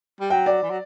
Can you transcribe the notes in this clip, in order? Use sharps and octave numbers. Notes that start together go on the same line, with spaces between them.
G3
F#3 G5
D5
E3
F#3